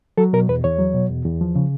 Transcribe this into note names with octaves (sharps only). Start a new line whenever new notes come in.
F#3 A4
B2 A#4
E2 B4
E2 C#5
F#3
B2
E2
E2
F3
C#3